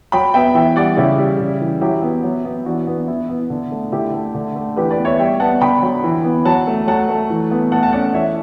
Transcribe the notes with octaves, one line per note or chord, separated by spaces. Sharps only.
F#3 G5 B5
B3 E5 G5
E3 E5 G5
G3 D5 F#5
C#3 E4 G4
G3
C#3
E3
F#3 E4 G4
B3
F#3
B3
E3 D4 F#4
B3
E3 E4
B3
D3
A3
D3 E4 G4
A3
D3
A3
E3 G4 B4
B4 D5
B3
C#5 E5
G3 E5 G5
B3 F#5 A5
D3 G5 B5
F#3
E3
B3
F#3 F#5 A5
A3
F#3 F#5 A5
A3
E3
B3
A3 F#5 A5
F#5 A5
C#4 D5 F#5
E3 C#5 E5